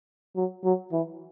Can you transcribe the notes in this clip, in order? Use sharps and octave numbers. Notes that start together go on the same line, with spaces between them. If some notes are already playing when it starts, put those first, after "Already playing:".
F#3
F#3
E3